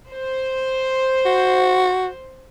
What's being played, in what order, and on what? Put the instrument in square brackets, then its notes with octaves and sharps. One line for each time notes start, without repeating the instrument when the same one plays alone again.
[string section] C5
[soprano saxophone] F#4